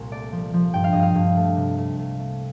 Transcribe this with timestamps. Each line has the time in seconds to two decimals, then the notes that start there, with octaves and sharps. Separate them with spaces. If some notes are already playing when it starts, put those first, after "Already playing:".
Already playing: C2 A#2
0.11 A3 D5
0.32 F3
0.54 F3
0.74 G2 G5
0.84 F5
0.93 G2 D#5
1.02 F5
1.15 G2
1.37 A3
1.57 C3
1.78 A3
1.99 A3
2.19 A3